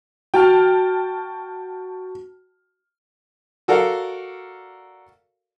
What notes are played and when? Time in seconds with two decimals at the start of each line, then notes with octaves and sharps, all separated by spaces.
0.34 F#4 G5 A5 F6
3.68 F#4 A4 A#4 D5 F5